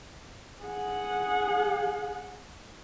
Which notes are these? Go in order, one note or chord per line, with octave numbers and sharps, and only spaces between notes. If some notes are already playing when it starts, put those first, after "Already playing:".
G#4 F#5